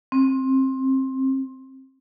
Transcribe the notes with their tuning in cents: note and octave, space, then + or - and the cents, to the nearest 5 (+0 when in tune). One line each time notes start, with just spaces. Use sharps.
C4 +20